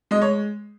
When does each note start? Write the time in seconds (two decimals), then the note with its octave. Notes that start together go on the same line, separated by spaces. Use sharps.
0.11 G#3 D#5
0.22 C#5